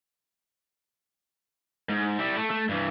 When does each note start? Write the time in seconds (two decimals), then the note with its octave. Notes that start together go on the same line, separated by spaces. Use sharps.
1.90 G#2
2.19 G3 E4
2.37 A3
2.51 A3
2.69 G2 E3